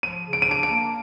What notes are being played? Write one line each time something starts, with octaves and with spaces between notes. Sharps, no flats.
F3 D#7
C#3
D7
D#7
D4 D7
D7
A#3